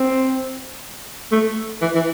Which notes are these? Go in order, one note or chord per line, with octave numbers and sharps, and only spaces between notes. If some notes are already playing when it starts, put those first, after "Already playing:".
Already playing: C4
A3
E3
E3